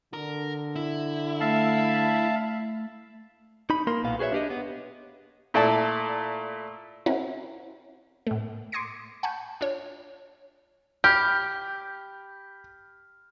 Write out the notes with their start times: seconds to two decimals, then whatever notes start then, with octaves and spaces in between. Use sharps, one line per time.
0.14 D3 A#4
0.76 E4
1.40 A3 E5 F5 A5
3.70 D#4 B5
3.87 A#3 A#4 C6
4.03 B1 A#2 B3 F5
4.19 F#4 G#4 B4 C#5 E5
4.32 D4 G4 D#5
4.50 B3
5.54 A#2 A3 E4 D5 A5
7.06 C4 C#4 E4 F#4 A#4
8.27 A2 A3
8.72 C6 D6 D#6 G#6 A#6 C#7
9.23 F#5 G#5 A5 B5 C#6 G6
9.61 D4 F4 C#5
11.04 G4 B5 F6 G6